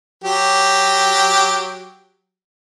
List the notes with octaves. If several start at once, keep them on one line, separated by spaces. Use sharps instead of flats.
F#3 G4